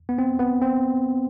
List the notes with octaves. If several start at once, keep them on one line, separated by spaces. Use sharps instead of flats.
B3
C4
B3
C4